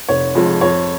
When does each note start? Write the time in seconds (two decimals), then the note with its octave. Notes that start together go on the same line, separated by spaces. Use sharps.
0.09 F1 C#5
0.35 F2 F3 G#3
0.61 F2 C#5